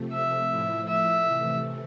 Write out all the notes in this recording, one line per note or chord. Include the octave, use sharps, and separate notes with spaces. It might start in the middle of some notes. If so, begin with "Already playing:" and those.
Already playing: C3 F3 A3
E5
A2 F3 A3 E4
E5
C3 E3 A3